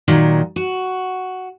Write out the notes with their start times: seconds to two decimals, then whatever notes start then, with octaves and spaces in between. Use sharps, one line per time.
0.08 A#2 D#3 F#3
0.56 F#4